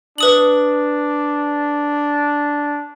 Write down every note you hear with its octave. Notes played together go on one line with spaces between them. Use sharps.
D4 B4 D#6 F#7